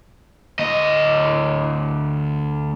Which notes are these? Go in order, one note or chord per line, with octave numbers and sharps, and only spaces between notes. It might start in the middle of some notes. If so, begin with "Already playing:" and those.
D2 D#5